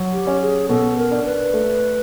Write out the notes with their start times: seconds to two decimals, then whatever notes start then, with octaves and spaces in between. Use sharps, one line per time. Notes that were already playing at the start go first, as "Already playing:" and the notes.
Already playing: F#3
0.12 G4
0.27 C#4
0.41 G#4
0.69 B2 A4
0.97 A#4
1.11 D4
1.25 B4
1.53 A3